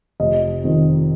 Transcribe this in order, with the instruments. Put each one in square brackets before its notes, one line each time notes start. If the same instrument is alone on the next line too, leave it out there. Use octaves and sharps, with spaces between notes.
[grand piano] F1 D#5
F2 D#3